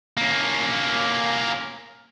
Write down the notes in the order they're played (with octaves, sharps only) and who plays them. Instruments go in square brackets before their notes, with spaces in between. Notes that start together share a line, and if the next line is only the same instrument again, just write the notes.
[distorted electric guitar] A#3 C#4